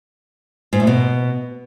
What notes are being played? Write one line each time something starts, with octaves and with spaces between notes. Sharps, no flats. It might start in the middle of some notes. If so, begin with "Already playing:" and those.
G#2
A2
B2